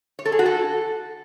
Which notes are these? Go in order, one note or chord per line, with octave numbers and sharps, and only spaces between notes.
C#5
A4
G#4
F#4
A4